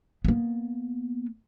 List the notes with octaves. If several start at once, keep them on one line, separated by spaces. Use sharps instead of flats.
A#3 B3